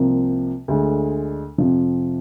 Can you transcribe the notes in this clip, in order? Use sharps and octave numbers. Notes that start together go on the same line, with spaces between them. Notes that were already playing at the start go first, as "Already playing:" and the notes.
Already playing: C2 C3 F3 A#3
D2 D3 G#3
F2 C3 F3